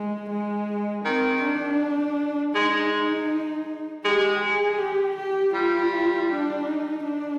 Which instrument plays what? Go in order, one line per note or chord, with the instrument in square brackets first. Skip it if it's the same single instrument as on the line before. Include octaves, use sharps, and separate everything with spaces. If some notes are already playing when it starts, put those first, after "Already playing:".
Already playing: [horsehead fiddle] G#3
G#3
[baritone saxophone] D#3 [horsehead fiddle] C4
[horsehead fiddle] D4
[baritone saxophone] G#3 [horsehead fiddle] D#4
[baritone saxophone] G#3 [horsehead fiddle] G4
[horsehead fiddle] G#4
G4
G4
[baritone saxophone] G3 [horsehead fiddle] F4
[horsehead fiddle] D4
D#4
D4